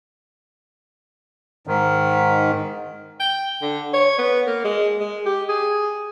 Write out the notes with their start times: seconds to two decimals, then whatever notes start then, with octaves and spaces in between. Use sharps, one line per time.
1.67 G#2 D#3
3.20 G5
3.62 D3
3.93 C#5
4.18 B3
4.46 A#3
4.64 G#3
5.00 G#3
5.26 G4
5.49 G#4